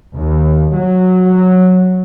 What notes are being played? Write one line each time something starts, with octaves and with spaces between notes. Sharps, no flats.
D#2
F#3